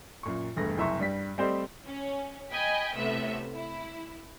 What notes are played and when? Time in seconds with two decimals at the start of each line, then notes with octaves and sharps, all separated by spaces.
0.23 F#2 A#2 C#6
0.56 E1 G2 A3 A#6
0.78 F#1 C2 E5 A#5 C6 C#6
0.99 G2 G3 B6
1.38 G3 A3 C4 G4 C5 D#5
1.85 C#4
2.51 D#5 G5 G#5 B5
2.96 A2 C3 B3 E5
3.54 E4